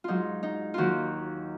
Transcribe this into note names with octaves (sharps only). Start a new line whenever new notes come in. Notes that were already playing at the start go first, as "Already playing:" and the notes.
G#2 F#3 D#4 F4
D#4
D#2 D#3 F#3 F4 F#4